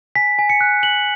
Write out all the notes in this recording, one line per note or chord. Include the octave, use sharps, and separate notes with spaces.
G#5 B6
G#5
C#7
F#6
F#6 F#7